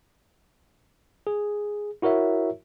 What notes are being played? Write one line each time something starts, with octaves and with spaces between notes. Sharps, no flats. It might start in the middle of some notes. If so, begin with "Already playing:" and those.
G#4
E4 F#4 A#4 C#5 E5